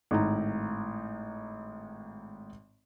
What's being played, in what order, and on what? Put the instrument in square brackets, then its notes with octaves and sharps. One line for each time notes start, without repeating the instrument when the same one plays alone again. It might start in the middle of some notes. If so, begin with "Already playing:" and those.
[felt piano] G#1 A2 A#5